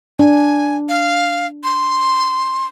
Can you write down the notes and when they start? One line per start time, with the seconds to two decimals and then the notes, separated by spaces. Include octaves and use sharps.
0.19 D4 G#5
0.89 F5
1.64 C6